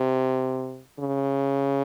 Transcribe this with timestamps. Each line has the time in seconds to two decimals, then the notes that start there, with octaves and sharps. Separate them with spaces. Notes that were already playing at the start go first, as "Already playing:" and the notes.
Already playing: C3
0.99 C#3